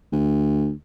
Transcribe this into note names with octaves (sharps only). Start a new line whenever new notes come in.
D2